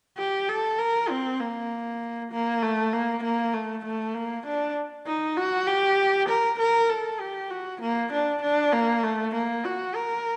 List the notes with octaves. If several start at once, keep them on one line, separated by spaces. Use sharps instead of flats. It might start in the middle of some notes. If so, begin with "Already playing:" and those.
G4
A4
A#4
C4
A#3
A#3
A3
A#3
A#3
A3
A3
A#3
D4
D#4
F#4
G4
A#4
A#4
A4
G4
F#4
A#3
D4
D4
A#3
A3
A#3
F#4
A#4